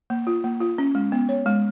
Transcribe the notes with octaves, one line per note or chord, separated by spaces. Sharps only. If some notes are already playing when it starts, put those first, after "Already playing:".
A#3
F4
A#3
F4
C#4
G#3
B3
C#5
G#3